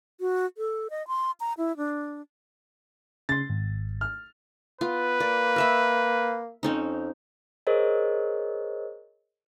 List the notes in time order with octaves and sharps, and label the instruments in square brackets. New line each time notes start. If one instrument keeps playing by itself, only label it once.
[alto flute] F#4
A4
D#5
C6
A#5
E4
D4
[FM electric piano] C#3 C6 [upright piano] A6
[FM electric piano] G#1
[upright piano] F6
[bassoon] B3 [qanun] F4 [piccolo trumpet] B4
[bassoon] A#3 [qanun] D5
[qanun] A#4 E5 B5
[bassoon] F2 [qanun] C4 C#4 D#4
[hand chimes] G#4 A#4 C5 C#5 D#5